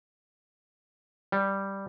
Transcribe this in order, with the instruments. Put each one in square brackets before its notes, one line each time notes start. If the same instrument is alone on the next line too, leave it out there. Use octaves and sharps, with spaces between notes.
[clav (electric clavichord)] G3